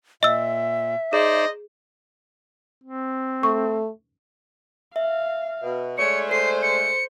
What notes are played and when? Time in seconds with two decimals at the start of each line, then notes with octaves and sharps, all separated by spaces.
0.23 A#2 D#5 E5 E6
1.13 D#4 G#4 C5 D5 D#5
2.84 C4
3.43 A3 C#6
4.96 E5 F5
5.61 B2
5.98 G#3 A3 D4 C#5 C#7
6.31 A4 C5 C7
6.62 C#7